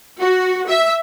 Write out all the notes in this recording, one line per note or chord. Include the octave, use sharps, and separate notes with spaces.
F#4
E5